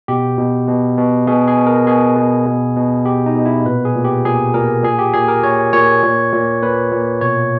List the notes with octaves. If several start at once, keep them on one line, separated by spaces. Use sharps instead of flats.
B2 G4
B2
B2
B2
B2 G#4
G#4
B2
A#4
B2 G#4
B2
B2
B2
B2 G4
D#4
B2
E4
A#2 B4
G#4
A#2
G4
A#2 G#4
A#2 A#4
A#2 G#4
G4
A#2 G#4
A#4
A#2 C#5
A#2 C#5
A#2
A#2
A#2 B4
A#2
B2 C#5